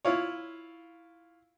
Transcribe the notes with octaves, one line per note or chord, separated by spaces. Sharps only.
E4 F4 C#5